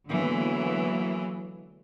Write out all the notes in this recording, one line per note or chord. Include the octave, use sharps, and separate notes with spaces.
D3 E3 F#3 G#3 A#3 B3